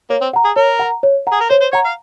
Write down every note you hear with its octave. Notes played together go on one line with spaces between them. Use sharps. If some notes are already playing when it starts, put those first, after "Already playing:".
A#3 C#5
C4
F#5 A#5
G#4
A#4 C#5
F#5 A#5
C#5
F#5 A#5
G#4
A#4
C5 C#5
C5
C#5 F#5 A#5
F5